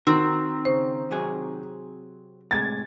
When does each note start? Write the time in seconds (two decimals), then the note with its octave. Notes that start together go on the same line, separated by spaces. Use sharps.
0.07 D#3 C4 F#4 A#4
0.65 C#3 C5
1.11 C3 F#3 G#4
2.51 A2 C3 G#3 G#6 A6